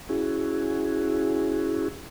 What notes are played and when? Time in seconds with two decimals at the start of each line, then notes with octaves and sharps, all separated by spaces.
0.09 C#4 E4 F#4 G#4